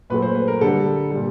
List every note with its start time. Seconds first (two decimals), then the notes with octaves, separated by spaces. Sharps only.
0.10 A#2 F#3 A3 B4
0.22 C5
0.35 B4
0.48 A#4
0.61 D3 G3 A4
1.11 A#2 G3